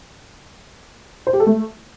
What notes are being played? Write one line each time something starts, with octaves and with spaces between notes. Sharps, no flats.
C5
G4
A4
A3